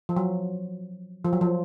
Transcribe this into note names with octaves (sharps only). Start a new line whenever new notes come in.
F3
F#3
F3
F#3
F3